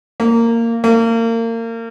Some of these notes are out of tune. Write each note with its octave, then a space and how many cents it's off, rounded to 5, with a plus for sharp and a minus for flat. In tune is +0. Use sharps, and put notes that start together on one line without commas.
A#3 -15
A#3 -30